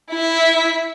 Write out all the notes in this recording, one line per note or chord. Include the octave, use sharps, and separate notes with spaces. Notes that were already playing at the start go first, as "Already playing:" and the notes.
E4 E5